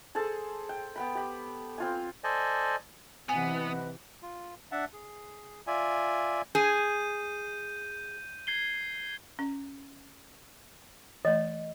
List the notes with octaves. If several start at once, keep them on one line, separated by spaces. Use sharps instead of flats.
G#4 A4 C5 A5
G5
B3 G5 B5
G4 B5
C4 F4 G#5
A4 C5 D5 D#5 G#5
C3 E3 B3 B4 D#5 F#5 G#5
F4
D4 E5 F#5 A5
G#4
F4 D5 E5 G#5
G#4 G6 D#7
G#6 C7 G7
C#4
E3 A3 D#5